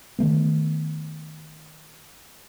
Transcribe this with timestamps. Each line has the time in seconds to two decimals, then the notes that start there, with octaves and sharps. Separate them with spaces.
0.19 D#3 E3 A3 B3